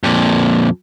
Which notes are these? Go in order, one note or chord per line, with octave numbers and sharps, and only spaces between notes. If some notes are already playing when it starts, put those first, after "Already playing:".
F2 A#2